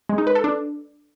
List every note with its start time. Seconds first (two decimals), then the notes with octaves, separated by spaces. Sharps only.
0.09 G#3
0.18 D#4
0.27 B4
0.35 A4
0.44 D4